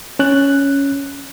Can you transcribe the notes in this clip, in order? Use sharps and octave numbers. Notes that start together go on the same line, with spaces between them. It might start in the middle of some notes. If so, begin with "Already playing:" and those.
C#4 F#6